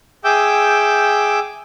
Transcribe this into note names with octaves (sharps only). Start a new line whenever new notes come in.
G#4 E5 G5 D6 E6 G6